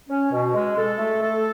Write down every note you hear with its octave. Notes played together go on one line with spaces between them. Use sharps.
C#4
B2
G#3
A4
A3
A4